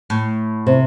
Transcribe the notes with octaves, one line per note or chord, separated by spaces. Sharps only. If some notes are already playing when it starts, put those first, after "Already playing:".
A2
C3